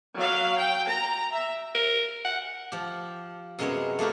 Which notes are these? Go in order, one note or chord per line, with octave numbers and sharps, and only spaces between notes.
F#3 F5
G5
A#5
E5
A#4
F#5
F3 G4
F#2 C3 G#3 B3 C4 C#5
A3 A#3 D#4 F#4 G4